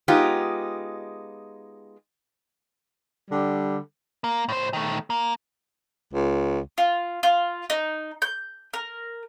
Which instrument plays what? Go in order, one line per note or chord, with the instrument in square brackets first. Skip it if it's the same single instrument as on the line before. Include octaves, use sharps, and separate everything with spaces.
[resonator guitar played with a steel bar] G#3 B3 D#4 F4 G4
[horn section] D3 G3
[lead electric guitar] A#3
A2 C5
D#3 A3
A#3
[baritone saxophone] C#2
[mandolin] F4
F4
D#4
G6
A#4